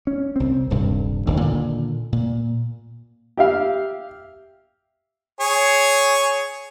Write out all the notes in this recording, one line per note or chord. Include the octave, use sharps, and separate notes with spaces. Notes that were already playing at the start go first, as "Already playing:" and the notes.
C#4
C2 C4
D#1 G2 C3
F#1 D#2 D3
A#2 D3 D#3
A#2
G4 E5 F5
G#4 C#5